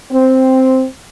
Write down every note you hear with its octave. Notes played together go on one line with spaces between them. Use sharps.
C4